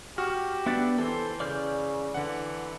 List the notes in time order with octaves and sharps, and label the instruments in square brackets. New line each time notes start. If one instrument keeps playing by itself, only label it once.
[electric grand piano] F#4 [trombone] G4 [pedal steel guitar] F6
[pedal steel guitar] B3 D4 [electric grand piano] E5 F#6 A6
[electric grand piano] E3 [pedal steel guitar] A4 C5
[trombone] C#3 [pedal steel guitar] D5 F6 G6
[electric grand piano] D3 F#5 [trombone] E3